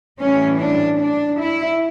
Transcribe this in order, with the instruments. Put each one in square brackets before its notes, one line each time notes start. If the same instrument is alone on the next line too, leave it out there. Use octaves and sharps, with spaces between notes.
[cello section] A2 E3 G3 C#4
D4
D4
E4